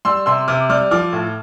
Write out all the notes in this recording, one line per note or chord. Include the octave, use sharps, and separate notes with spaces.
G3 C6 E6
C3 C6 E6
C3 D6 F6
G3 D6 F6
F3 D6 F6
A2